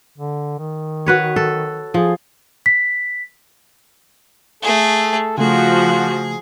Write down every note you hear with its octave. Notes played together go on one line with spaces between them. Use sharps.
D3
D#3
F#4 B4 C#5
A4
F3 G#4
B6
A3 G#4 A4
C#3 F3 A3 F4 F#4 G#4